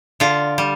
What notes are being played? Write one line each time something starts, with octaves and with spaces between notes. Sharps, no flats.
D3 F4
G3